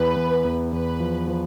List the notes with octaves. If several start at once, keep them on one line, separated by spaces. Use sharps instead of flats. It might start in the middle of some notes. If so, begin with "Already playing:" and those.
Already playing: E2 B4
E2
E2
E2 B4
F3
F3